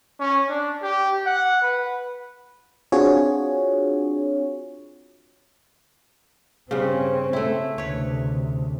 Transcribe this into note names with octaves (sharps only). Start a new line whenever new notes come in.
C#4
D4
G4
F#5
B4
C4 D4 F4 F#4 G#4 C#5
G2 C#3 C4 C#4
A3 E4
D2 C3 B4 C#5